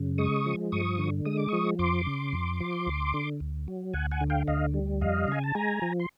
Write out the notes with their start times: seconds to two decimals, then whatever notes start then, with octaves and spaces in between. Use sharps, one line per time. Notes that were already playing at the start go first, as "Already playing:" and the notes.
Already playing: F#2 C#3
0.18 G#3 C#6 D#6
0.46 F3
0.72 G2 C#6 D#6
0.98 D3
1.25 G#3 D#6
1.37 D6
1.49 F3 C#6 D#6
1.79 F2 C6 D6
2.06 C#3
2.33 F2
2.60 F3
2.87 D2
3.14 D3
3.40 D2
3.68 F#3
3.94 D2 F#5 G#5
4.11 F#5 G#5
4.21 D3
4.30 F5 G5
4.47 D2 D#5 F5
4.74 G3
5.01 F2 D#5 F5
5.28 C#3 G#5
5.44 A5
5.55 G#3 G#5 A#5
5.82 F3
6.00 C6